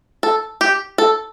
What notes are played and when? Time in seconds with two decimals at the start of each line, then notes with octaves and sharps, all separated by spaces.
0.23 A4
0.61 G4
0.98 A4